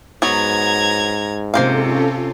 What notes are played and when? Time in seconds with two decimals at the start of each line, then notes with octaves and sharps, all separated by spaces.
0.22 G#2 F#3 B3 A#5 G#6
1.54 C3 A#3 C#4 F4 A4 C5 F5